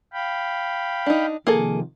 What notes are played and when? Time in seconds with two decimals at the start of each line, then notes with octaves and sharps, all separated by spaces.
0.13 F5 G5 B5
1.06 D4 D#4
1.47 C3 D#3 F3 A#3 G#4 A4